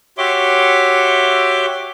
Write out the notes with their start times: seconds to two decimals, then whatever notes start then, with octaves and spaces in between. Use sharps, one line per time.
0.18 F#4 G4 C#5 E5 C6 D6